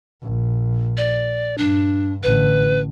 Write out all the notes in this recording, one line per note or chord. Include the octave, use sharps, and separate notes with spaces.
A#1
D5
G2 D4
A1 D3 B4